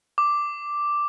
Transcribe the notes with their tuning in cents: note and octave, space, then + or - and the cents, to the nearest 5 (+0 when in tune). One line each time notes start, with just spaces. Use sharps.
D6 +0